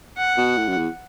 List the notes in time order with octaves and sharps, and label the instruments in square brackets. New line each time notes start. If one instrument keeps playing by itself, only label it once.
[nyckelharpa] F#5
[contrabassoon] B2
A2
F#2
E2